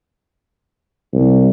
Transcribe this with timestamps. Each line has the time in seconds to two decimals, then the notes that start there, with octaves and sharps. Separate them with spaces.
1.13 C2